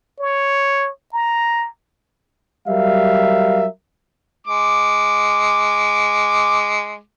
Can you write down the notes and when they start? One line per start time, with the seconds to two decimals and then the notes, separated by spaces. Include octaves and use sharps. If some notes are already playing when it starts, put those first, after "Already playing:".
0.20 C#5
1.13 A#5
2.67 F#3 G3 A#4 E5 F5
4.47 G#3 D6